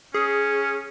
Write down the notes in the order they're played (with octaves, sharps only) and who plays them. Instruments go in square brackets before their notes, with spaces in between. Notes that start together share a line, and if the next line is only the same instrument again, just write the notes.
[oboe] C#4 [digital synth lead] G#4